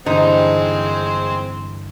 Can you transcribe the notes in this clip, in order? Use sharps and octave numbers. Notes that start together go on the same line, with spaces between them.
G2 D3 E3 G#3 C4 D#4 C5